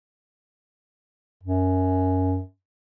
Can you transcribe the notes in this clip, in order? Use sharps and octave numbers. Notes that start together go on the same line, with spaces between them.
F#2